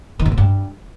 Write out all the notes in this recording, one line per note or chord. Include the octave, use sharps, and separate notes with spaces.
D#3
G#2
A2
G2